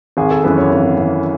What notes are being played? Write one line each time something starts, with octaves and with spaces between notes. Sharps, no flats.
G#1 G#4
A4
F#2 E3 B4
C#5
G#1
F#2 E3